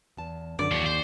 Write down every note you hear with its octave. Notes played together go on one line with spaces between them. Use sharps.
E2 A5
F#2 D3 D5
D#2 F3 F#4
C5